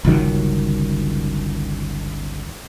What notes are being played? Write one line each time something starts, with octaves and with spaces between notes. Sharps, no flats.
G1 C#2 D#3 F#3